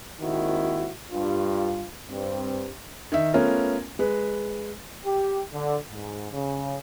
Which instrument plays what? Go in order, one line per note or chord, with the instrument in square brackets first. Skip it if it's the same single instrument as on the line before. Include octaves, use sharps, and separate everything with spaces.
[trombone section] G#1 D#2 D#3 C4 E4 F#4
G2 F4
G2 C4
[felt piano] D#3 E5
A3 B3 C#4 F4 A#4
G#3 B4
[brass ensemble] G4
D3
G#2
C#3